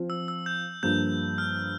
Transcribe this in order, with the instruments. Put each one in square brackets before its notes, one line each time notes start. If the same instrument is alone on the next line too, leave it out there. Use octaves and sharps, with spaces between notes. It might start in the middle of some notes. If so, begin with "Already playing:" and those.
Already playing: [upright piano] F3 C4 F4
[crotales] E6
E6
G6
[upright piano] G2 F3 A#3 [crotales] G6
[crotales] F6